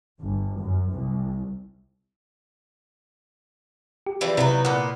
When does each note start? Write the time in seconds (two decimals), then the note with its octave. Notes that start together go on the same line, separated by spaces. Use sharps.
0.20 G1
0.58 F#2
0.91 C2
4.07 G4
4.21 E3 F3 G3
4.37 C3 F#3 B3 D#4 E4 B4
4.65 A#2 B3 F#5